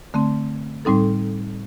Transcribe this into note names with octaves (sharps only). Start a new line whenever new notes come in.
D3 A3 C4
A2 G3 C4 D#4 A4